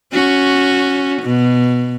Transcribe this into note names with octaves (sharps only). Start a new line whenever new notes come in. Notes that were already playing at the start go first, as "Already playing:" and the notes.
C#4 F#4
B2